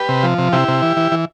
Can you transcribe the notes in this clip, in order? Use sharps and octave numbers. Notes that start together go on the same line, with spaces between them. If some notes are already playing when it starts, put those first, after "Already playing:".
Already playing: G4 B4
C3
F3
C3
C3 E4 G4
C3
E3
E3
E3